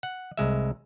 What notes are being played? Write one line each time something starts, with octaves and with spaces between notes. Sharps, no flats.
F#5
C2 G#3 E5